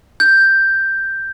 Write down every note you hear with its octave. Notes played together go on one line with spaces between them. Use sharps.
G6